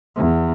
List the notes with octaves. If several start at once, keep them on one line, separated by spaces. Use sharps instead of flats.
E2